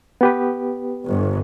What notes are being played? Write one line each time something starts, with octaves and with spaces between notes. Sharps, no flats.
B3 G4 B4
G1